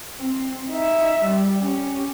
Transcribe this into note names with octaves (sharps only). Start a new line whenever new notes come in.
C4
D#4 E5
G3
C#4 G4